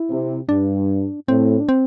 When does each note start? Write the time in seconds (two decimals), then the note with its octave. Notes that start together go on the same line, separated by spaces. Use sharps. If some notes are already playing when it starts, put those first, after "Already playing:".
Already playing: E4
0.10 C3
0.49 G2 D4
1.28 A2 C4
1.60 D4
1.69 C4